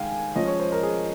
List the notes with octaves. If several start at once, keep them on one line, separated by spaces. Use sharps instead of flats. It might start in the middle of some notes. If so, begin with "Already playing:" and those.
Already playing: D#3 G#3 D#4 F5 G5 G#5
F3 G#3 C#4 F4 D#5
C#5
C5
A#4
G#4